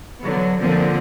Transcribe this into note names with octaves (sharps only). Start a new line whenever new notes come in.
D3 F#3 B3
A#2 D3 F3 C4